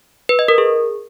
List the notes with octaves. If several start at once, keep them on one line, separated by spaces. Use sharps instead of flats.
B4
D#5
A#4
G#4